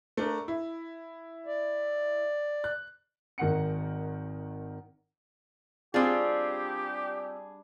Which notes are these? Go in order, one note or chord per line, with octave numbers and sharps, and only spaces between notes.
A3 D4 A#4
E4
D5
F#6
G#1 D#3 A#4 F#5 C#7
G3 C4 D4 F4 G4 G#4